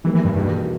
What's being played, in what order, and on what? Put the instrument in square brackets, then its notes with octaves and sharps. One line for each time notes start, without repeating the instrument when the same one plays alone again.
[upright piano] D#3 G3 A#3 [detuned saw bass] E3
[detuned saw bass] E3
G2
[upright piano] E2 B2 A#3 [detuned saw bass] G2